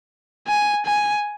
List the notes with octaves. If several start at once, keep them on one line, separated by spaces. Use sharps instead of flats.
G#5
G#5